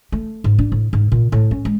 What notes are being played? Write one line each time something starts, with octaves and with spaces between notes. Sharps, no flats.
A3
G#2
D4
A2
G#2
A#2
A2
C#4
G#3